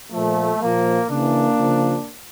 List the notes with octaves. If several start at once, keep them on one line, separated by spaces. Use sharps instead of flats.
A#2 F3 A3
A#2 F3 A#3
C#3 E3 A#3 D4
C#3 F3